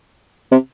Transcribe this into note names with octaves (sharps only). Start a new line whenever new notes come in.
C3